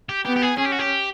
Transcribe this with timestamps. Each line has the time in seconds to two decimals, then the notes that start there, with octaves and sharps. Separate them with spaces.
0.09 G4
0.25 B3 G4
0.36 G4
0.42 G#4
0.58 C#4 G#4
0.66 G4
0.72 F#4
0.79 G4